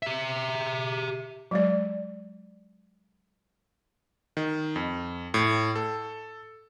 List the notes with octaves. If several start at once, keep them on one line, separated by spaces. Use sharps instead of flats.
G4 E5
F#3 G#3 D5
D#3
F2
A2
A4